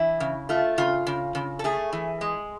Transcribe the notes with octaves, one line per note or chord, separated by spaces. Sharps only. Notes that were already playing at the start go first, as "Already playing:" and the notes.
Already playing: E3 E4
C#3
A3 F4
C#3 F4
C#3
C#3
A4
A3 G#4
E3
G#3